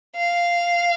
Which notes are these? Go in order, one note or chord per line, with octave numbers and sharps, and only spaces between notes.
F5